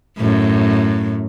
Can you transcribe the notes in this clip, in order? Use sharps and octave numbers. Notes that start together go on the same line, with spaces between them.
F#2 A2